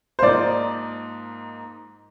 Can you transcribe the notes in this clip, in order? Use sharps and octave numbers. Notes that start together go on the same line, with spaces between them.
C5
G#2 F3 A#3 D#4 D5